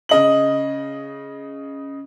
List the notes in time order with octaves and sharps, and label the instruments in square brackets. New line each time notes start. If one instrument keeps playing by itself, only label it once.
[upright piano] C#3 D#5 F#7